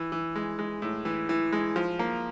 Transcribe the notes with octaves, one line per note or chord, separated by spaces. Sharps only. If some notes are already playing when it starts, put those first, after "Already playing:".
Already playing: E3
E3
G#3
G#3
A2
E3
E3
G#3
F3
A#3